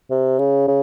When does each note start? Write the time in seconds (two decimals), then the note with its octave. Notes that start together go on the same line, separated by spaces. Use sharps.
0.10 C3
0.39 C#3
0.68 C#3